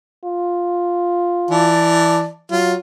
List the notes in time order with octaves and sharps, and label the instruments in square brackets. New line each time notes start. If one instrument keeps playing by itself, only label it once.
[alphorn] F4
[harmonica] E3 D5 A5
[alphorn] F#3 [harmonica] F4